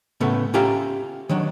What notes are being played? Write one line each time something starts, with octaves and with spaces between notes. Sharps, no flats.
A2 C#3 A3 B3
C#4 F4 G4 E5 F5 A#5
D#3 F#3 D4